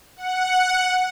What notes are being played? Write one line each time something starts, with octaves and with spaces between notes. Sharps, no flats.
F#5